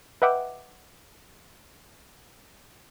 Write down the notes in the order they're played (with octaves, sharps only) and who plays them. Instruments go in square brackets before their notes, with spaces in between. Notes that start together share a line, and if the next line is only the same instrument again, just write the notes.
[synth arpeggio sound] B4 D#5 E5 F#5 G5 D6